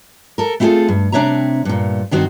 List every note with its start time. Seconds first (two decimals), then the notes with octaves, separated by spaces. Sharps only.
0.38 A4 A#4
0.60 A3 C4 E4 F4 G#4 A4
0.88 G2
1.12 C3 C4 D4 C#5 E5 A#5
1.65 G2 A#2
2.11 G2 D#3 C4 F#4 C5